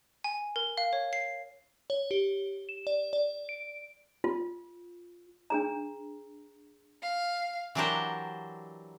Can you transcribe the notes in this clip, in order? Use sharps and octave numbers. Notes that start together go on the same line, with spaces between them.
G#5
A#4
F5
C#5
C7
C#5
G4
E7
D5
D5
D7
F4
D4 G#4 A#5
F5
E3 F#3 D4 G4 A#4 C5